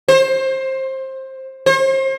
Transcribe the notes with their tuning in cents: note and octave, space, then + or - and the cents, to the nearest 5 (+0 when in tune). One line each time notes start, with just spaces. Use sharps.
C5 +20
C5 +35